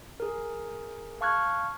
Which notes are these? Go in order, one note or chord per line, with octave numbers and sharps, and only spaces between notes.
G#4 A#4
F5 A5 C#6 F6 F#6 G#6